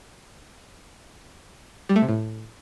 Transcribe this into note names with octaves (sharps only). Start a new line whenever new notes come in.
G3
A3
C3
A2